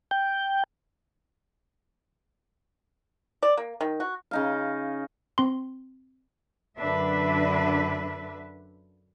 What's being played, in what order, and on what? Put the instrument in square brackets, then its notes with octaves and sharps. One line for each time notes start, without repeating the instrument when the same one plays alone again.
[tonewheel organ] G5
[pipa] D5
A#3
D#3
F#4
[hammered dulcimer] C#3 D#4 F5
[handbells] C4 C6
[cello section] F#2 D3 D4 B4 E5